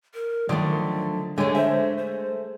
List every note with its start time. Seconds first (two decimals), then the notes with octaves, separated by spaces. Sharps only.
0.14 A#4
0.49 D3 D#3 F3 F#3 A3 D5
1.38 D3 G#3 A3 G4 C#5 G#5
1.55 C5 E5
1.98 C5